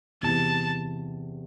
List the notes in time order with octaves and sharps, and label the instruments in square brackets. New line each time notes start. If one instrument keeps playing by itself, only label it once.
[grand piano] E2 C3 E3 [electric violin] A5